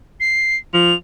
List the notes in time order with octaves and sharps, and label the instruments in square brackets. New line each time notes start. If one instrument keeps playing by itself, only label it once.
[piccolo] C7
[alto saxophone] F3 [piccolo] F7